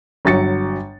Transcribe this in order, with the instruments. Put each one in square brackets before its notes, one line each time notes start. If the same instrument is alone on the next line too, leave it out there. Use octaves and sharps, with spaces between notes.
[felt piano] G1 F#3 A6 C#7